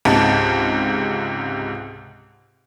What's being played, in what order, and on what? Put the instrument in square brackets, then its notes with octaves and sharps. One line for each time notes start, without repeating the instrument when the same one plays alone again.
[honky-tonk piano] C#2 G#2 C3 A5